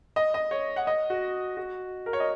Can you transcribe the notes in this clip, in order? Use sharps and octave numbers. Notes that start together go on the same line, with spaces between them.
D#5
D#5
C#5
F#5
D#5
F#4
F#4
A#4
C#5
D#5